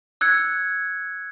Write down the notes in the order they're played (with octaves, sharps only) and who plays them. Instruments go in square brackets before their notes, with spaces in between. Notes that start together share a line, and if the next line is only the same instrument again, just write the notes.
[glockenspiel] E6 F#6 G#6 C#7